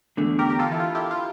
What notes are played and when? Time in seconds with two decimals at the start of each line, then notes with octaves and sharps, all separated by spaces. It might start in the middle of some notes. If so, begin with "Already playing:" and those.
0.17 E2 D3 A3 D4
0.39 G4 A#4
0.50 G4
0.59 F4 A4
0.72 E4
0.80 F4
0.95 E4 G4
1.11 F4